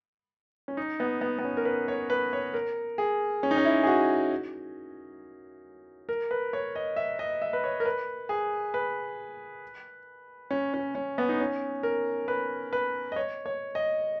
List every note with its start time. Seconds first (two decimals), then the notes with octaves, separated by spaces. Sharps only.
0.68 C#4
0.77 D#4
1.00 B3
1.21 B3
1.39 B3
1.44 C#4
1.57 A#4
1.65 B4
1.88 C#5
2.10 B4
2.33 C#5
2.54 A#4
2.98 G#4
3.43 C#4
3.51 D#4
3.58 C#4
3.65 E4
3.83 G#4
3.87 F#4
6.09 A#4
6.31 B4
6.53 C#5
6.76 D#5
6.96 E5
7.19 D#5
7.42 E5
7.53 B4
7.64 C#5
7.80 A#4
7.86 B4
8.29 G#4
8.74 B4
10.51 C#4
10.74 C#4
10.95 C#4
11.18 B3
11.29 D#4
11.40 C#4
11.83 A#4
12.28 B4
12.73 B4
13.12 D#5
13.16 C#5
13.46 C#5
13.75 D#5